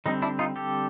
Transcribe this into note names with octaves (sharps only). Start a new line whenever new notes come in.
D3 G3 C4 D#4
D4 E4
D#4 F4
G4 A4